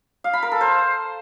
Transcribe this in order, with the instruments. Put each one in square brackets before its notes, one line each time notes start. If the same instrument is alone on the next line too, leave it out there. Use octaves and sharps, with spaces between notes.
[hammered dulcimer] F5
B5
A#4
A4
C5